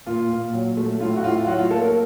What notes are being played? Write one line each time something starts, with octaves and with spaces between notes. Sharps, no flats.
A#2 F4
A#2
F#3
A3
A2 F4
F#4
A2 F4
F4
F#3 F#4
F4
A#3 A4
A#4